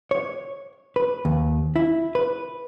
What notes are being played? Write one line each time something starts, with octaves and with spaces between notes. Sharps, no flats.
C#5
B4
D#2
E4
B4